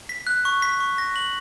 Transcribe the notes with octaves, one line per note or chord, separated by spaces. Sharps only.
B6
F#6
C#6
B6
C#6
A#6
F#7